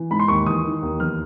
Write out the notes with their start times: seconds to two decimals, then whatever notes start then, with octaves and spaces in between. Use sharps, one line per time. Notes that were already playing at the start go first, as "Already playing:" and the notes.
Already playing: E3
0.11 G#2 B5
0.20 C6
0.28 D#2 C#6
0.46 E3 D#6
0.64 D#3
0.82 D#2
1.00 E2 F6